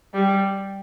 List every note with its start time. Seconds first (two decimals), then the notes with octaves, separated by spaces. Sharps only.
0.14 G3